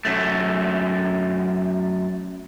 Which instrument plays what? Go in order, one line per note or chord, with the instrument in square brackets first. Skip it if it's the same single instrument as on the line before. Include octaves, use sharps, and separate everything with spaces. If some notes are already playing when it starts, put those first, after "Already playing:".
[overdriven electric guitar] F#2 A3